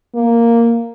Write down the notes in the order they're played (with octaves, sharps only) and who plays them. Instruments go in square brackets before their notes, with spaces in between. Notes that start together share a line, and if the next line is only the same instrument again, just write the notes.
[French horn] A#3